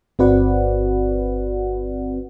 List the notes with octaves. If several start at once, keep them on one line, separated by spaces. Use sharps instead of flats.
G1 C4 F#4 B4 D5 F#5